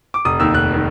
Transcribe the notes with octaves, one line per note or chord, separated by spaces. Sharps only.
D6
F1 D#6
D#2 D#3 E6
F1 F#6
D#3